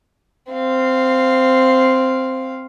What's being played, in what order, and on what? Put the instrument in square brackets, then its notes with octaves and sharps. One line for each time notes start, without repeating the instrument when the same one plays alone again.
[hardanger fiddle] C4 F5